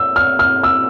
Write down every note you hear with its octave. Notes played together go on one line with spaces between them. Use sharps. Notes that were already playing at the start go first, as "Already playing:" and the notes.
Already playing: E6
F6
F6
E6